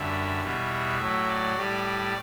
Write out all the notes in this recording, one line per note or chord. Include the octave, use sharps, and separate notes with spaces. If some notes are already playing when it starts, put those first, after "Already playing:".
Already playing: F#2 D3 G3 E5
E2 B2 G3
A2 F#3 E5
D5
A2 G3